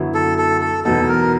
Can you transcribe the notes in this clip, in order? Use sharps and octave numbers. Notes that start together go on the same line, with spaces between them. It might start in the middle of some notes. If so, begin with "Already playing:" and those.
Already playing: F#2 D3 F#3 B3 E4
A4
A4
A4
E2 B2 F#3 B3 D#4 A4
A#4